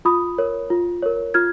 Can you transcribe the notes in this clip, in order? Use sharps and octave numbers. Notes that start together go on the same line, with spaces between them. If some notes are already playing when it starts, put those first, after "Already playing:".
F4 B5 D#6
A#4 C#5
F4
A#4 C#5
F4 F6 G#6